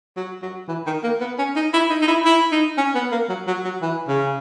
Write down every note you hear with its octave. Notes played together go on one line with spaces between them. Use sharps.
F#3
F#3
E3
D#3
A#3
B3
C#4
D#4
E4
D#4
D#4
E4
E4
D#4
C#4
B3
A#3
F#3
F#3
F#3
E3
C#3